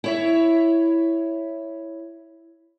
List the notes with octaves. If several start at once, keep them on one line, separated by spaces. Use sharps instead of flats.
E4 C#5 E5